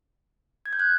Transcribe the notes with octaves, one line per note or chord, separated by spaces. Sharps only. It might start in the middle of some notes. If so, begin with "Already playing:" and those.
G#6
G6
F#6 G#6